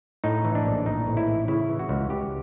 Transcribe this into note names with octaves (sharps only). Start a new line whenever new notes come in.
A2 D#4
E3
D4
A#1
A#1 D#4
A2
E4
E3
C#3 E4
E3
F#4
C#2
C#2 G4